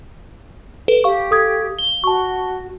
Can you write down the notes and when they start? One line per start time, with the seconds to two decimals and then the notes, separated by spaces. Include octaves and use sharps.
0.88 A4 B4
1.04 G4 F5 C#6
1.31 A4 D#6 G#6
1.79 G7
2.04 F#4 A5 C#6